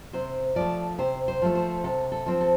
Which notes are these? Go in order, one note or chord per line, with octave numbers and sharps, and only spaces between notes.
C3 C5
F3 A3 D5
C3 C5
C5
F3 A3
C5
C3 A4
A4
F3 C4
A4